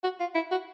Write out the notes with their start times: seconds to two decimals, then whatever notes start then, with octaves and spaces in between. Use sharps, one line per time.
0.03 F#4
0.20 F4
0.35 E4
0.51 F#4